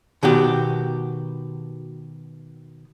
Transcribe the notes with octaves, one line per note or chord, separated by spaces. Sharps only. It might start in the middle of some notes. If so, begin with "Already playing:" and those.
B2 D#3 F#4 G4